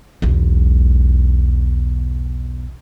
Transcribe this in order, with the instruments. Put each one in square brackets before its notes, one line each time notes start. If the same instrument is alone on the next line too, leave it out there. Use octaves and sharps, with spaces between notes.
[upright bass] B1 E2